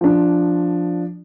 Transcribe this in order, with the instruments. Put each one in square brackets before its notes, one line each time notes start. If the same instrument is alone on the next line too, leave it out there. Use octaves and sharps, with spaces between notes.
[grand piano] F3 D4